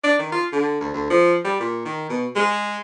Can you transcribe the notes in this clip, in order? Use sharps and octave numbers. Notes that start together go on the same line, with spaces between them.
D4
D#3
F4
D3
D2
D2
F3
G3
A#2
D#3
B2
G#3